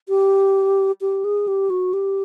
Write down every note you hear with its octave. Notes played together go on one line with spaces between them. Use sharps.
G4
G4
G#4
G4
F#4
G4